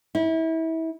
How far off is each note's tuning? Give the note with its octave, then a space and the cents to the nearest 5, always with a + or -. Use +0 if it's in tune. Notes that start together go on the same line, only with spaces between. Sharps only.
E4 -30